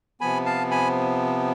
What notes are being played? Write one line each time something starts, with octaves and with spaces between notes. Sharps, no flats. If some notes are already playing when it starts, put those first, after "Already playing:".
C3 F3 B3 G#5 B5
F5 A5
G#5 B5